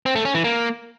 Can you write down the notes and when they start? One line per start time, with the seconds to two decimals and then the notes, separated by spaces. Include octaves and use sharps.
0.06 C4
0.15 A3
0.25 C#4
0.35 E3
0.44 A#3